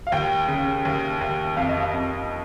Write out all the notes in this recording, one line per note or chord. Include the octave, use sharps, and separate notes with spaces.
F5
D#2 G5
C#3
D#2
D#2
F2 F5
D#5
F5
F2